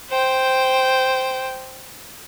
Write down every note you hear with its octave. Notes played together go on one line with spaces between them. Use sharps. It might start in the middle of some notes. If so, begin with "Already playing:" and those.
C5 G5